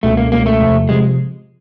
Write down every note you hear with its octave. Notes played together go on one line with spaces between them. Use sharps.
C#2 B2 G#3 A3 C#4
A#3
C#2 B2 G#3 A#3 C#4
A3
E2 C3 F3
C3 F3 G#3